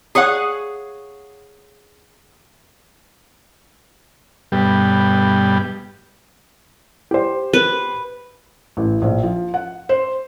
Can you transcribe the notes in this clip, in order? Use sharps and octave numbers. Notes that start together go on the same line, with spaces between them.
G#4 C#5 F5 F#5
G2 B2 G3
G4 C5
B4
A1
A#1
F3
F#5
C5